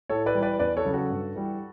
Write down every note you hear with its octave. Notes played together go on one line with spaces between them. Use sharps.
A2 A4 C#5
B4 D5
E3 G3
B4 D5
E2 B4 D5
A4 C#5
C#3 F#3
F#4 A4
G2
E3 G3